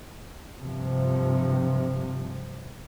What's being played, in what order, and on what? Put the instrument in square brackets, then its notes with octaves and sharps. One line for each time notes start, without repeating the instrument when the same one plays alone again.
[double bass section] G2 C3 F3